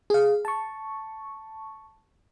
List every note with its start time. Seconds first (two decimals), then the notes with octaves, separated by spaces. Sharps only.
0.10 G#4 F5
0.45 A5 C#6